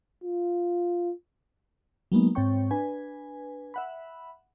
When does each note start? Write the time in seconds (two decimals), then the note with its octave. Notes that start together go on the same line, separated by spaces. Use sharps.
0.24 F4
2.12 F#3 G#3 A#3 B3 D#4
2.35 G#2 C4 C#5 G5 C#6
2.71 D4 B4 G#5
3.74 E5 F#5 B5